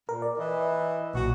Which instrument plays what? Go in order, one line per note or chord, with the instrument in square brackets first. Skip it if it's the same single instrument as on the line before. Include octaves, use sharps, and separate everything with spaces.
[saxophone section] A#2 [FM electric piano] A#4
[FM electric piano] D5
[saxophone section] E3 E4 D#5
[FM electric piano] B1 A#2 [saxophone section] F#4